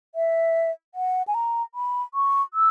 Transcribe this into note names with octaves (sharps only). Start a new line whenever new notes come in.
E5
F#5
G#5
A#5
B5
C#6
E6